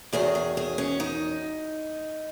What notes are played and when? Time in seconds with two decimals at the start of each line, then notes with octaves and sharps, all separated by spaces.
0.13 E2 D#3 F#3 G#4
0.35 G#4
0.57 G#4
0.78 C#4
1.00 D#4